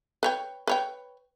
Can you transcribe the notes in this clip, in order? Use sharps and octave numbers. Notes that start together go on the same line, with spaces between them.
B4 C#5 G5
B4 C#5 G5